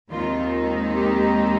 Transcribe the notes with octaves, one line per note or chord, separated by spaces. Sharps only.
D#2 D#3 G#3 C4 D#4 F4
G4